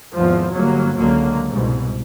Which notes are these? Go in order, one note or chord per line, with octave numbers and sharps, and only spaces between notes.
G#1 E2 F3
G1 F#3 A#3
C#2 D3 F#3 A#3
C2 G#2 B2